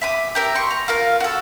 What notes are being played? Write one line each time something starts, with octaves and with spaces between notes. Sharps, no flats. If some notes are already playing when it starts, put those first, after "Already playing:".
E5 D6 D#6
G4 A#4 E5
C6 C#6
A#5
F4 A#4 F5
F#4 A4